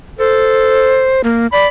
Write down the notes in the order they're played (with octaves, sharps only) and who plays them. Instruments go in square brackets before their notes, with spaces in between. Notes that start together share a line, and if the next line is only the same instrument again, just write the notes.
[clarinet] A4 [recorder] C5
[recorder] A#3
[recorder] D5 [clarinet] B5